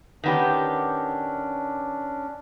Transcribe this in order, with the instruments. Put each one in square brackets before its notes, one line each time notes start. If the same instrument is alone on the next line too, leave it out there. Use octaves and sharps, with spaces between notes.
[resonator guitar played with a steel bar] D#3 B3 G4 [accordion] C#4 D4